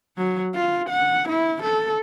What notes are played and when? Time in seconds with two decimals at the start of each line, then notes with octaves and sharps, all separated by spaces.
0.17 F#3
0.55 F4
0.90 F#5
1.29 E4
1.63 A4